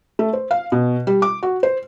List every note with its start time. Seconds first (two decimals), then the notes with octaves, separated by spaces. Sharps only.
0.19 A3
0.33 C5
0.51 F5
0.72 B2
1.07 G3
1.22 D6
1.43 F#4
1.63 C5